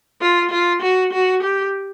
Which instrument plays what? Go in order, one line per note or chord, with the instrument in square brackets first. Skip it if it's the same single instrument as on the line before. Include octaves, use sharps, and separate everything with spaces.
[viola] F4
F4
F#4
F#4
G4